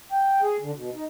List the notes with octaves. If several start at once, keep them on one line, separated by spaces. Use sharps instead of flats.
G5
G#4
D3
B2
D#4